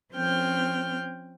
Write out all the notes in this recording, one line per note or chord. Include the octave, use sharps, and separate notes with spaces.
F3 C4 C#4 G5 F6 G6